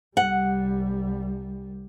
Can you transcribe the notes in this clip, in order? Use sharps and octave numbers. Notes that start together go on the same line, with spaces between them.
C2 G3 F#5